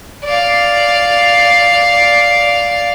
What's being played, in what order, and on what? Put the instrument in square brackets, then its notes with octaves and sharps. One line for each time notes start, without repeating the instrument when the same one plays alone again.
[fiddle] D5 F5